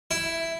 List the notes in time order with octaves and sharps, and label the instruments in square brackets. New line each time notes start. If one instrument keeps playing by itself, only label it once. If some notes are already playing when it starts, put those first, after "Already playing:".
[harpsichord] E4